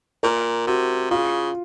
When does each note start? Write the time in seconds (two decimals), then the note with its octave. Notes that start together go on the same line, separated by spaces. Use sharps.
0.23 A#2 A#4
0.67 C3 F#4
1.11 C#3 F4